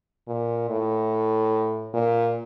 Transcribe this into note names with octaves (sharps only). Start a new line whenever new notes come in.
A#2
A2
A#2